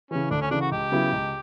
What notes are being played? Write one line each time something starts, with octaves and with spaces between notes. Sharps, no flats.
C#3 E3 C#4
D2 D4
C#4
C#3 E3 D4
F#4
C#2 G4
C#3 F#3 B3 E4
C#2